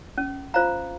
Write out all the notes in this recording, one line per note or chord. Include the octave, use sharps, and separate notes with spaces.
C#4
F4 C5 F5 A#5